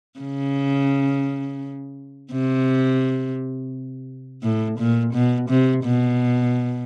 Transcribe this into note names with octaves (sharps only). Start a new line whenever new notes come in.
C#3
C3
A2
A#2
B2
C3
B2